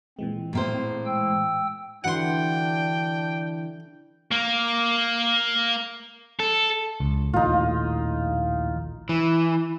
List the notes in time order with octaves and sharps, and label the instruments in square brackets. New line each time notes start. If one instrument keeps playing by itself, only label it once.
[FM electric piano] A#2 E3 G#3 [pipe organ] C4
[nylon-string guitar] A2 A#3 C5
[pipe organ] G5 E6
[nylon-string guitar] D3 E3 F#4 [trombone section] D4 [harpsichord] F#5 C6 [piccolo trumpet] G5
[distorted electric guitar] A#3
A4
[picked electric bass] C#2
[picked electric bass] A#1 D#2 A2 [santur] D#4 F4
[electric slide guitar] E3